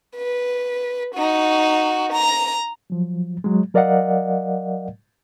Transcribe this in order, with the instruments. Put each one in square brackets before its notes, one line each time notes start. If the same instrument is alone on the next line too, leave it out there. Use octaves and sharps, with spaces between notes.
[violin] B4
D#4 F#4
A#5
[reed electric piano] F3 F#3
F#3 G#3
F#3 A#4 D5 D#5 F5 F#5